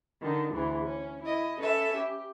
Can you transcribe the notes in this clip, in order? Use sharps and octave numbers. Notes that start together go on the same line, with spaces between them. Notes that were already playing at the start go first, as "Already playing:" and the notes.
D3 D#3 D#4
D2 E3 G#4
C#4
E4 D#5
C#4 A4 B4 E5
G4